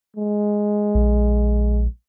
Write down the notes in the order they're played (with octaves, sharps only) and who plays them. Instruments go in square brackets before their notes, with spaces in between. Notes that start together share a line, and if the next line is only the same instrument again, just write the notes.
[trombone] G#3
[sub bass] A#1